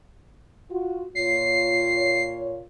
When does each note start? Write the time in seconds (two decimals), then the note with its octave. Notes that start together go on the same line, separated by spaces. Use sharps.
0.70 F4 F#4
1.15 A#2 F4 C#5 C7